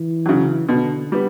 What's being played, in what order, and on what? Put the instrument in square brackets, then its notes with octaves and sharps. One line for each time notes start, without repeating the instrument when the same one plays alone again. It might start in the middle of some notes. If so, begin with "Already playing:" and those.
Already playing: [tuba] E3
[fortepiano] C#3 F#3
[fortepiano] B2 [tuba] D3
[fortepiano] G3 B3